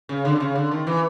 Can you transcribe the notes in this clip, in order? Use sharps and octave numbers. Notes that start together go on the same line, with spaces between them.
C#3
D3
C3
C#3
D3
D#3
E3